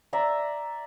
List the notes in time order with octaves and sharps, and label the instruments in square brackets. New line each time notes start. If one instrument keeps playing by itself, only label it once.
[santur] D5 E5 A#5 E6